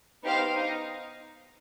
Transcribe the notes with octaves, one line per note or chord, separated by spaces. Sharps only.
B3 D#4 G4 C5 F5
D#4